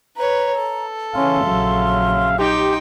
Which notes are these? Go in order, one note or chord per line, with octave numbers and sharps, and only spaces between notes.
B4 C#5 A#5
A4
C#3 E3 C#4 E5 F5 C6
A#1 F#3
D#4 G4 G5 C6